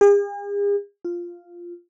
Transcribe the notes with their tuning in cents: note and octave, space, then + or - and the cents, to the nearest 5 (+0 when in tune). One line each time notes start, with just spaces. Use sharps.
G#4 -45
F4 -5